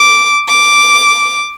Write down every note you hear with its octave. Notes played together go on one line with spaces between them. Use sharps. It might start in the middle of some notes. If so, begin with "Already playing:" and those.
Already playing: D6
D6